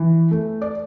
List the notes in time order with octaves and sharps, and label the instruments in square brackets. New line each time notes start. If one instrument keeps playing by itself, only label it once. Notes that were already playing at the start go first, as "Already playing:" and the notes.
Already playing: [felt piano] E3
A3
D5